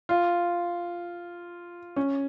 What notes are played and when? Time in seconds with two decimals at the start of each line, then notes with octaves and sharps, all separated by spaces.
0.09 F4
1.96 C#4